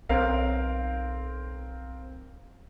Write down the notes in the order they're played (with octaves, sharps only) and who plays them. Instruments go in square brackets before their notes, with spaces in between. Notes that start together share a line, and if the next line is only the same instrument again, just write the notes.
[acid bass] B1 [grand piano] C4 A#4 F5